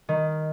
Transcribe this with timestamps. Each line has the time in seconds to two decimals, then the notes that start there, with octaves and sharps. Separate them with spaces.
0.09 D#3